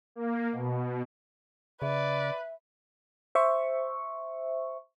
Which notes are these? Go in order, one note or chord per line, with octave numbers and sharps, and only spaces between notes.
A#3
B2
C#3 B4 D5 E5
C5 E5 C#6